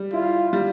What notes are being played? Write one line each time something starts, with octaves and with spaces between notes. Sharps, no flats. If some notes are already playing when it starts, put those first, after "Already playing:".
Already playing: G3
E4 F4
G3